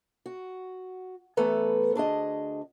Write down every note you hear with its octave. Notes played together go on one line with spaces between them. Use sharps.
F#4
E3 A3 B3 A4 B4 A#5
D2 D4 G#4 D#5